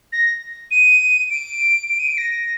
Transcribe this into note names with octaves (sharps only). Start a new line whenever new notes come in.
A#6
D#7
D7
D7
D#7
D7
A#6